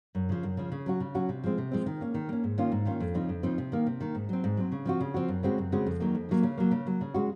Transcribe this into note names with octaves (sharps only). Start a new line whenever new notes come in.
F#2
C#3 F3
F#2
C#3 F3
C#3
F#3 C#4 F#4
C#3
F#3 C#4 F#4
C3
F3 G#3 C4
C3
F3 G#3 C4
D#3
A#3 C#4
D#3
A#3 C#4
G#2
D#3 A#3 C#4 F4
G#2
D#3 A#3 C#4 F4
F2
C#3 F3 C4 D#4
F2
C#3 F3 C4 D#4
C3
D#3 A#3
C3
D#3 A#3
G#2
F#3 C4
G#2
F#3 C4
C#3
F3 C4 F#4
C#3
F3 C4 F#4
F#2
C#3 G#3 C4 F#4
F#2
C#3 G#3 C4 F#4
F2
D#3 F#3 A#3
F2
D#3 F#3 A#3
C#3
F#3 A#3
C#3
F#3 A#3
C#3
G#3 C#4 F#4